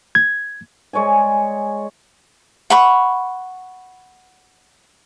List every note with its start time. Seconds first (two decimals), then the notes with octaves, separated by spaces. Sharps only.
0.15 G#6
0.93 G#3 C#5 D5 G#5
2.70 F#5 B5 C#6